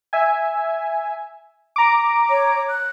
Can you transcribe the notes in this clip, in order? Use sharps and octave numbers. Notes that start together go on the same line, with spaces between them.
E5 G#5
A#5 D6
C#5
F#6